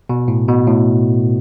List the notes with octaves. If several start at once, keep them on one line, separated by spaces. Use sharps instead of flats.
B2
A2
B2
A2